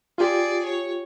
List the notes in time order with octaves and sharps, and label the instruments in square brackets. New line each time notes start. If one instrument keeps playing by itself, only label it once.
[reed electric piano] F4 G4 [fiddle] G#4 D5
[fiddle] C#5